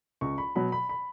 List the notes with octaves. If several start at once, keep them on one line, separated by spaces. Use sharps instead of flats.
C#2 C#6
B5
B2 F#3 B5
B5
B5